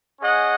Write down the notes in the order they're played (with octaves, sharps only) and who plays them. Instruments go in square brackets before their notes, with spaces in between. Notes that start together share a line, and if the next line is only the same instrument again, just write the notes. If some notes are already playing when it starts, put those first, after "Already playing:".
[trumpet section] C#4 G#4 D#5 F#5